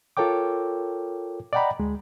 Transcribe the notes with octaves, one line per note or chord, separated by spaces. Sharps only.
F4 A4 A#4 C#5 G5 D6
D5 D#5 F#5 G5 A#5 B5
D2 G#3